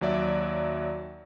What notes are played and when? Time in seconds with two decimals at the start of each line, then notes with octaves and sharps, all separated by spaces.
0.01 D#2 F#3 D5 E5